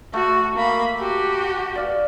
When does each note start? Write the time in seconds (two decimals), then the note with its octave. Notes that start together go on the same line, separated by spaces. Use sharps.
0.14 A3 F#4
0.56 A#3 B5
0.99 F#4 G4
1.75 D5 F5